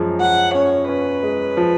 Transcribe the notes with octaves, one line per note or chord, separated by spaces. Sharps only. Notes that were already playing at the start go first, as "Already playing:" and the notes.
Already playing: F#2 F3 G#3
F3 F#5
C#4 C#5
C#4 B4
G#3
F3